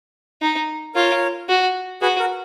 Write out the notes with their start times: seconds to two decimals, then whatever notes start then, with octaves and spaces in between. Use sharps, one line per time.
0.42 D#4
0.95 F4 A#4 C#5
1.49 F#4
2.02 F#4 G#4 B4
2.19 F#4 A#4